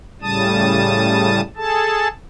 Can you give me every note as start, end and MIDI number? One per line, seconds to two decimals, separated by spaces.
0.22 1.41 45
0.22 1.41 49
0.22 1.41 55
0.22 1.41 81
0.22 1.41 87
1.57 2.08 68
1.57 2.08 69
1.57 2.08 81